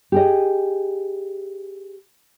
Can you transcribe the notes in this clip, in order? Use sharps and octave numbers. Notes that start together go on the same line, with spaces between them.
G4 G#4 D#5